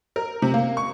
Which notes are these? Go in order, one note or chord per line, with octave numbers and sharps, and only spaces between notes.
A#4
C3
A#3
C#6